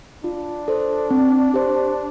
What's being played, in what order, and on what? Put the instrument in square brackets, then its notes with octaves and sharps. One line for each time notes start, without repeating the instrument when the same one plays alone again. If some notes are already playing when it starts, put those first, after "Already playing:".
[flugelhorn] D4 [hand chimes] F4
[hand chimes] A4 C5
C4
G4 C5